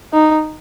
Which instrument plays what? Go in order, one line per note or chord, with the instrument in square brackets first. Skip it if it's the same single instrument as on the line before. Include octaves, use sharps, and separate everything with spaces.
[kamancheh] D#4